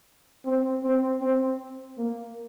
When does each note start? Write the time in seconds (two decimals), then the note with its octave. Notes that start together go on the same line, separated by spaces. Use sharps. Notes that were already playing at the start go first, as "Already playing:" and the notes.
0.45 C4
0.84 C4
1.21 C4
1.98 A#3